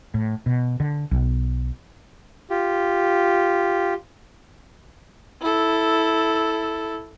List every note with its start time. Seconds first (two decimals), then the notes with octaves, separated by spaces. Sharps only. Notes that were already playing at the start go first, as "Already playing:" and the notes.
0.14 A2
0.46 B2
0.80 D3
1.11 B1
2.50 F4 G4
5.41 E4 A4